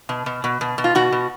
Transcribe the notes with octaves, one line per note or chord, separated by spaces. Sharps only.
B2
B2
B2
B2
B2
F4
B2 F#4
B2